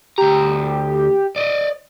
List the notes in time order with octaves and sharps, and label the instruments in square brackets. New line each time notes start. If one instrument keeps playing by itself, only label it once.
[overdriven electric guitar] D2 A#5 [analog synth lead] G4
[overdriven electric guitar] D5 D#5